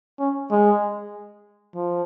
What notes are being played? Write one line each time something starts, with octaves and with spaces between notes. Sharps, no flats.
C#4
G#3
F3